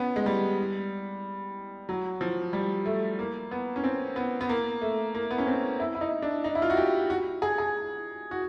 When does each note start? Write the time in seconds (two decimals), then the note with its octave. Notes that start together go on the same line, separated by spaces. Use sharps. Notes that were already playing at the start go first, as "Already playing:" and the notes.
Already playing: B3 C#4
0.16 G#3
0.26 G3
1.89 F#3
2.21 F3
2.53 G3
2.86 A3
3.19 A#3
3.51 B3
3.76 C#4
3.84 C4
4.16 B3
4.41 B3
4.49 A#3
4.81 A3
5.15 A#3
5.31 B3
5.38 C#4
5.47 C4
5.80 E4
5.95 E4
6.01 D#4
6.22 D4
6.44 D#4
6.55 E4
6.62 F4
6.70 F#4
6.77 G4
7.10 F#4
7.42 G#4
7.58 G#4
8.31 F#4